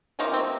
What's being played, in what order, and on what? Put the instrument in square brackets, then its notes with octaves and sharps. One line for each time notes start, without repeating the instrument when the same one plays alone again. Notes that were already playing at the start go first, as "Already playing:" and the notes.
[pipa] C3 F3 A#3 C#4 D#4
C4